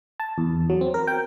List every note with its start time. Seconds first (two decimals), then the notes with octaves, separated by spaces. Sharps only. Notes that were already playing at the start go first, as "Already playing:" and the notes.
0.20 A5
0.38 E2
0.70 F#3
0.81 C4
0.94 A#4
1.07 G5